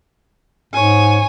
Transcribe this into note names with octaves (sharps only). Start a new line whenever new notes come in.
G#2 C#5 G#5